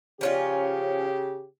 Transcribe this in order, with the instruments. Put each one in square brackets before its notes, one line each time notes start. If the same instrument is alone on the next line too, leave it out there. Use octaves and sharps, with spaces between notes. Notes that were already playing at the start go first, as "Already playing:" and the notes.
[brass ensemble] C#3 G4 [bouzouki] F3 C#4 F4